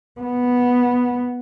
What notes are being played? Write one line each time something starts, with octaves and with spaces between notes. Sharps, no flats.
B3